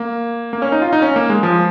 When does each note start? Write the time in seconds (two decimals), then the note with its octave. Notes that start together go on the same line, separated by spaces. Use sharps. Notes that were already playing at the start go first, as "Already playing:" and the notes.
Already playing: A#3
0.53 A#3
0.62 C#4
0.72 D#4
0.82 F4
0.93 D#4
1.02 C#4
1.16 A#3
1.30 G#3
1.43 F3